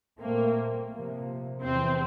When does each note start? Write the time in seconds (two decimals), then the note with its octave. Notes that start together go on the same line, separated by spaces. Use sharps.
0.20 A#2 A3 A#3 C4
0.92 C3 F3 A#3
1.62 E2 C3 F3 C4